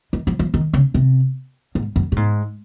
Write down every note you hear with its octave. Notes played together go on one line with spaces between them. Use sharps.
D#3
F3
F3
D#3
C#3
C3
G#2
F#2
A#2
G#2